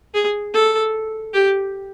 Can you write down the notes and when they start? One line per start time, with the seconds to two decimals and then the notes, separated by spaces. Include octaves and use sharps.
0.14 G#4
0.54 A4
1.34 G4